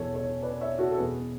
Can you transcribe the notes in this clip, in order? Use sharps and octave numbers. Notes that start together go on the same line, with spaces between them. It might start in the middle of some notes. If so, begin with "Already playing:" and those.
Already playing: E2 B2 A4 C#5
A4 C#5
B4 D5
C#5 E5
F#4 A4
A4
E2 B2 G#4 B4